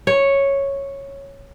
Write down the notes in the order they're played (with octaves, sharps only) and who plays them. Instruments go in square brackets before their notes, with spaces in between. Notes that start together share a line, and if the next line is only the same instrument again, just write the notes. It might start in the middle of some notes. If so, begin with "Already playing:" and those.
[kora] C#5